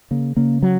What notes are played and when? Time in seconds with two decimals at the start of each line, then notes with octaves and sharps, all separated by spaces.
0.11 C#3 A#3
0.37 C#3 A#3
0.63 F#3